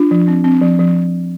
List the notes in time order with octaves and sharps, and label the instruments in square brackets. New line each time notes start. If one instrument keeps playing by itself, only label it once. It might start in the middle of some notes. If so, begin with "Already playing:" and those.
Already playing: [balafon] D4 F4
F3
C4
C4
F3
F3